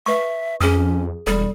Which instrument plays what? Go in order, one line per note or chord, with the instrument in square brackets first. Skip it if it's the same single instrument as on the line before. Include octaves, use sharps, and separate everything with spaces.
[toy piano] B4 C#6 [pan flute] E5
[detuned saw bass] F2 [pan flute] C#4 [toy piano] G#4 D#6
[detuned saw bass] E1 [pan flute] G3 [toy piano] A4